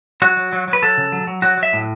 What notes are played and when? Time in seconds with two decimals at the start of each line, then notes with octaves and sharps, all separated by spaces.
0.22 F#3 F#4
0.37 F#3
0.53 F#3
0.68 F#3
0.73 B4
0.83 F#3 A4
0.98 C#3
1.12 F#3
1.27 F#3
1.42 F#3 F#4
1.58 F#3
1.63 E5
1.73 A2